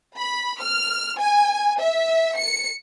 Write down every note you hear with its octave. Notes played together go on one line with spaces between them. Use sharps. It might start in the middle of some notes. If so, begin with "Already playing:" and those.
B5
F6
G#5
E5
C#7